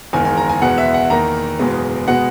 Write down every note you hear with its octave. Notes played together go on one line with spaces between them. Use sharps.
F#1 E2 D#3 G#3 G#5
G#5
A#5
G#5
E2 B2 G#3 B3 F#5
E5
F#5
E2 D#3 A#3 A#5
F#1 E2 B2 G#3 B3
B2 G#3 B3 F#5